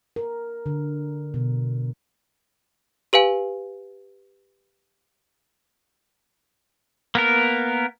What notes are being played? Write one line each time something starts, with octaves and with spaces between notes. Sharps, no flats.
A#4
D3
B2
G4 B4 F5 G#5
A#3 B3 A#4